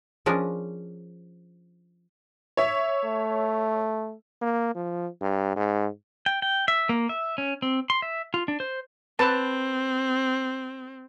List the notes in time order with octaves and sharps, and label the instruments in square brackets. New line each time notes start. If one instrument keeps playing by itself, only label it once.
[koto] F3 C#4 D4 G#4 A#4
[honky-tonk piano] C#5 E5
[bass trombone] A3
A#3
F3
G2
G#2
[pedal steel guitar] G5
G5
E5
A#3
E5
C#4
C4
C6
E5
F4
D4
C5
[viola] C4 [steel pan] B4 A5